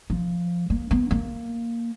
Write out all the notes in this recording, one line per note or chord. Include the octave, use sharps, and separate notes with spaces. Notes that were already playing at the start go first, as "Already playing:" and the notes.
F3
A#3
B3
A#3